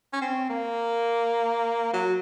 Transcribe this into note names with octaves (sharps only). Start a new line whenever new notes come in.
C#4
C4
A#3
F#3